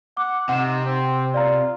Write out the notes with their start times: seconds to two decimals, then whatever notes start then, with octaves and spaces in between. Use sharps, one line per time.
0.17 F#5 D6
0.49 C3 D#4 F#5 E7
0.84 C4
1.34 F4 D5 F5 A#5